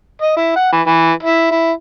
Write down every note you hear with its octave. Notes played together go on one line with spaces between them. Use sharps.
D#5
E4
F#5
E3
E3
E4
E4